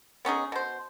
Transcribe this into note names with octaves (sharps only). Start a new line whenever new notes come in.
B3 C#4 D#4 G#4
B2 C5